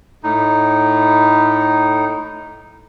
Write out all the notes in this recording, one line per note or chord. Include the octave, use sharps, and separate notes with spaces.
A2 D#4